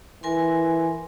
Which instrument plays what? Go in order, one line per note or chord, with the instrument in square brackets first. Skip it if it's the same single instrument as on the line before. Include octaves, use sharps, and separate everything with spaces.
[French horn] E3 [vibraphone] A#4 G#5 C6